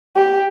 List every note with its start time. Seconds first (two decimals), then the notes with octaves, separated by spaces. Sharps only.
0.15 G4